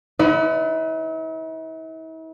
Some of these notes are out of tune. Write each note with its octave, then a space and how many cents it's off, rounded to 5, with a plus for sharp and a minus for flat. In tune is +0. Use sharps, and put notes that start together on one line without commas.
E4 -45 B4 +30 D5 +0